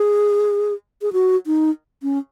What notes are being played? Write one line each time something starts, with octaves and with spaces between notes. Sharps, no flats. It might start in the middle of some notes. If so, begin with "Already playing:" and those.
Already playing: G#4
G#4
F#4
D#4
C#4